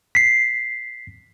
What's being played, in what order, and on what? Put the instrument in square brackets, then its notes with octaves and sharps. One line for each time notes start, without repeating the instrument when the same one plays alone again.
[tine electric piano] B6 C7